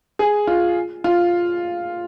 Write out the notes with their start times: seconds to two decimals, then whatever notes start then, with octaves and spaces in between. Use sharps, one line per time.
0.19 G#4
0.47 F4
1.04 F4